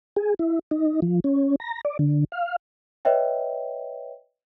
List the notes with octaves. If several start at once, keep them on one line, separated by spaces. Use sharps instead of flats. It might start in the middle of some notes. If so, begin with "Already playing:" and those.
G#4
E4
D#4
F3
C#4
A#5
D5
D3
F5
B4 C#5 D#5 E5 G5